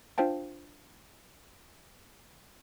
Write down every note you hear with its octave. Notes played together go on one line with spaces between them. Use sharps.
D4 F4 C5 F5 G5 A5